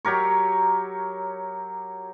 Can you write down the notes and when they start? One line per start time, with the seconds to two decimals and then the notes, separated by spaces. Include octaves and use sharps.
0.05 F#3 G4 A#4 C#5